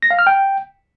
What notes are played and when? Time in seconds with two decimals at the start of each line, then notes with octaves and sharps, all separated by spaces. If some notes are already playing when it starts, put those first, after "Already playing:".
0.02 A#6
0.11 F5
0.19 F6
0.27 G5